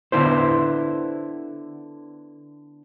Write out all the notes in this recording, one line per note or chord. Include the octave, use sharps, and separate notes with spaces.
D3 B3 E4 C5